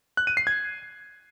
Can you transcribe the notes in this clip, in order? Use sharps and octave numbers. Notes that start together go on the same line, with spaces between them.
F#6
D#7
C7
G#6